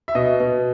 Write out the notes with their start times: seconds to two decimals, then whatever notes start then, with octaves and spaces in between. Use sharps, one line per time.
0.08 E5
0.15 B2 D#5
0.40 B2